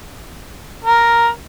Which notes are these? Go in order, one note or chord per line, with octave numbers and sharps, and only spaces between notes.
A#4